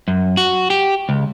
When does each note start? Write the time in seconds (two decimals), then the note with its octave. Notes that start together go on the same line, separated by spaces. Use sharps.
0.08 F#2
0.37 F#4
0.70 G4
1.09 C#2